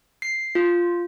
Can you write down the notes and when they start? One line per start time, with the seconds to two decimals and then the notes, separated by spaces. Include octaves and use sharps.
0.22 C7
0.55 F4